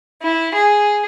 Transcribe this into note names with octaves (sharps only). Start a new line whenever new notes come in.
E4
G#4